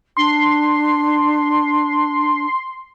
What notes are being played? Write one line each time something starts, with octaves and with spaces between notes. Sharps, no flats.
D4 C6